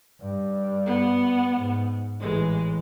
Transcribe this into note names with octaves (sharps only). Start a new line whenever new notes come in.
G2 G3
B3
G#2
A1 E3 G#3